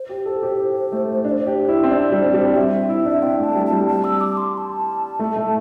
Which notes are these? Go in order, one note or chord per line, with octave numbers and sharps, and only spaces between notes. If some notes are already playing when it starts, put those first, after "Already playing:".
Already playing: C5
G4
A4
G4
A3
D4
G4
E4
C4
D4
G3
G3
C4 E5
E4
D4
C4 G5
A3
A5
G3
A5
G3
A5
E6
D6
C6
C6
A5
A3
A3